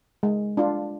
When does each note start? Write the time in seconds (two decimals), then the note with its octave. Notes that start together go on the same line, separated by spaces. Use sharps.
0.23 G#3
0.57 D4 F4